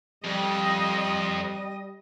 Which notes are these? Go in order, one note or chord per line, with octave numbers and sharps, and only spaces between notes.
F2 G3 D#5